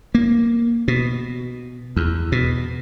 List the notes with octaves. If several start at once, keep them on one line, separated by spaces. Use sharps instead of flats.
A#3
B2
E2
B2